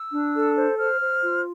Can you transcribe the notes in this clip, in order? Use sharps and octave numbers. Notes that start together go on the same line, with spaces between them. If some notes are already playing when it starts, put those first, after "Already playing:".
Already playing: E6
D4
A4
C5
C5 F6
C5
F4